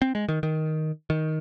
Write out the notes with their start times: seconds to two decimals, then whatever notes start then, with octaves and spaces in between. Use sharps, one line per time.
0.02 C4
0.15 G#3
0.29 D#3
0.43 D#3
1.10 D#3